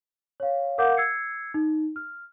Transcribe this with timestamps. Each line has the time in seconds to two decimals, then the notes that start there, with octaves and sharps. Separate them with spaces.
0.40 C#5 F5
0.78 A#4 F5 F#5 D6 G6
0.97 E6 G#6 C7 C#7
1.54 D#4
1.96 F6